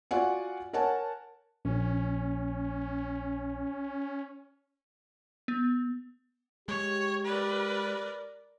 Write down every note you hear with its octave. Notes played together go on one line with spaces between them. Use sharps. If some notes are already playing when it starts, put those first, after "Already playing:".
F4 F#4 D5 F#5 G#5
A#4 C#5 F#5 G#5 A5
A#1 C#4
B3
G#3 G4 C#5
A#4 B4 D5